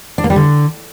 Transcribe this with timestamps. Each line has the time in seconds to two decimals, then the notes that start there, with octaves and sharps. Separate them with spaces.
0.18 D4
0.24 A#3
0.30 G3
0.36 D3